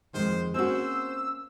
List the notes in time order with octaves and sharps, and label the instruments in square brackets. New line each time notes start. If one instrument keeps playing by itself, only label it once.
[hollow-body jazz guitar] F2 G#2 D#3 [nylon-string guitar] G#3 [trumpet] C5
[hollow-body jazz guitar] A#3 C#4 G#4 [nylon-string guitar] C4 F#4 [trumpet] C5 [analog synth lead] E6